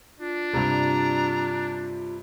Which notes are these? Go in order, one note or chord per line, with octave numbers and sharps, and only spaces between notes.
D4 F4
G2 C3 A#5